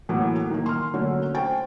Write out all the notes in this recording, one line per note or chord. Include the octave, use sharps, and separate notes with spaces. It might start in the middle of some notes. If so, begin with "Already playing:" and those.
A2 E3 F#3 A#3 B3
D#3 A#3
C6 F6
D3 F#3 A3 A#3 C#4
C5 G5 C#6 A6